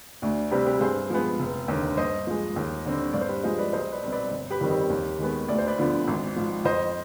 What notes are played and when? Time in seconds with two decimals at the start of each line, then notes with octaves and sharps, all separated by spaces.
0.22 D2 D4
0.51 C3 G3 C4 G4 B4
0.66 G4 B4
0.81 G2 G#4 C5
1.10 F3 G#3 B3
1.39 F1
1.68 D#2 D3
1.97 G2 C5 D#5
2.27 F3 G#3
2.56 D#2
2.85 D3 G3 C4
3.13 G2 D5
3.21 C5
3.29 G4 B4
3.44 F3 G#3 C5 D#5
3.59 B4 D5
3.73 B1 C5 D#5
3.92 B4 D5
4.03 B2 G3 C4
4.12 B4 D5
4.31 G1
4.50 G4 B4
4.61 F2 D#3 G3 C4
4.70 G4 B4
4.90 D#2
5.19 D#3 G#3 B3
5.48 D2 D5
5.58 C5
5.67 B4 D5
5.78 D3 F3 B3
6.07 G#1
6.36 G#2 F3
6.65 F2 C5 D#5